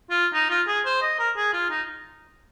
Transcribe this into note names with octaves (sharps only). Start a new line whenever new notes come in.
F4
D#4
F4
G#4
C5
D#5
A#4
G#4
F4
D#4